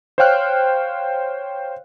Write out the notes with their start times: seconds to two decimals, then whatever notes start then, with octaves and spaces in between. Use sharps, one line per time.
0.18 C5 C#5 F5 G5 F6 F#6